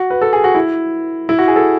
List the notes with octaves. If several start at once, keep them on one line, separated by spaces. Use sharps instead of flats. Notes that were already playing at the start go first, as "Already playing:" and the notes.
Already playing: F#4
B4
A4
G#4
F#4
E4
E4
F#4
G#4
A4